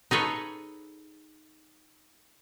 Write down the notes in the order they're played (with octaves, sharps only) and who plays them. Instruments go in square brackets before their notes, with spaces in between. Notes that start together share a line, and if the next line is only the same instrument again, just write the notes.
[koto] D#4 G#4 A4 B4 C#5